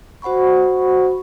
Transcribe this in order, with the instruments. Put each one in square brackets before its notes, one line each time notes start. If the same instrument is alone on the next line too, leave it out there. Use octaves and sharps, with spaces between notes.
[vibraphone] F#4 C5 F#5 B5 C#6